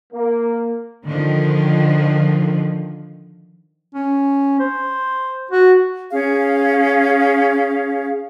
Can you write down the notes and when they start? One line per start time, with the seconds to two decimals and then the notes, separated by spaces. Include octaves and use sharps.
0.13 A#3
1.06 D3 D#3 F3
3.95 C#4
4.60 C5
5.51 F#4
6.11 C#4 G#4 F5